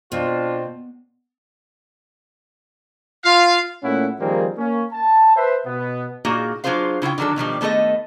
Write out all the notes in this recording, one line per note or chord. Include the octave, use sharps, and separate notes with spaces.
B2 C4 D4 F4
F4 F5
A#2 A3 C#4 E4 F#5
D#3 F3 G3 A#3 C4 G#4
A#3 C#4
A5
B4 C5 E5
B2 B3
A#2 A#3 D#4 F#4 G#4
F#3 D4 F4 G#4 C5 F5
C#3 E4 F4 G5
D3 D#3 F#3 D4 A4
B2 D#3 F3 G3
D#3 A3 B3 A4 D#5